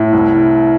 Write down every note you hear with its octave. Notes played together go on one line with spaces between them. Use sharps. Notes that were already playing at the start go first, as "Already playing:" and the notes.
Already playing: A2
C2